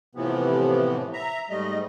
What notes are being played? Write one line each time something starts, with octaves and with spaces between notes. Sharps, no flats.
A2 C3 E3 F3 B3
E5 A#5
G#2 G3 A3 D#5